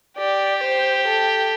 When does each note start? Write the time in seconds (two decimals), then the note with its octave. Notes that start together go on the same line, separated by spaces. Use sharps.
0.17 G4 D5
0.63 C5
1.08 A4